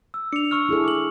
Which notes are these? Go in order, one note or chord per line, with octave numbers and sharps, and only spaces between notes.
E6
D4 C#7 F7
C#6 E6 F6
E4 G#4 A4
D6 F#7